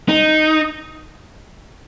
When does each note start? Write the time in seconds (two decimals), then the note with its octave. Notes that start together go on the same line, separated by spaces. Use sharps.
0.09 D#4